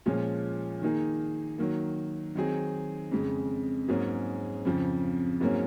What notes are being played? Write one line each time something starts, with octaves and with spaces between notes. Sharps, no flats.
A#2 F3 G#3 C#4 F4
D#3 A#3 D#4 G#4
D#3 F#3 A#3
D#3 F#3 C4 D#4 G#4
F2 C#3 G#3
G#2 F#3 A#3 C#4 G#4
F2 C#3 F3
G#2 F#3 A#3 C#4